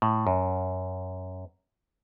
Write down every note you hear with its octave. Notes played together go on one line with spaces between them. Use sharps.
A2
F#2